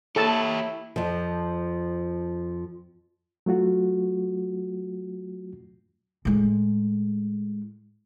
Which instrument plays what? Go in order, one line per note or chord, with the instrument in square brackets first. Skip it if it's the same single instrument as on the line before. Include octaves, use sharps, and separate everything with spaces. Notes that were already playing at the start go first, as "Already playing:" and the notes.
[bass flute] A#3 [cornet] E4 [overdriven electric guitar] G4 C#5 [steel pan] A4 A5
[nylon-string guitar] F2 F3
[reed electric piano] F#3 A3 F4 F#4
[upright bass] A2 G#3